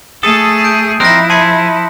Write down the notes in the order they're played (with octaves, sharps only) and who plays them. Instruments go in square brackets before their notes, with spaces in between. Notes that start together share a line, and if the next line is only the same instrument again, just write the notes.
[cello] A3 G#4 [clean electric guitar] A4 [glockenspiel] D#6
[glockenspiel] G6 D7
[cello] F3 E4 [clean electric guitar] C4 D#4 A#4 [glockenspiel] F#6 A#6
[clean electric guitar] G#4 [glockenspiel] A5 C6 C#7